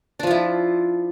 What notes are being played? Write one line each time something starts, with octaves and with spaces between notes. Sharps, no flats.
F3 D4 E4 F4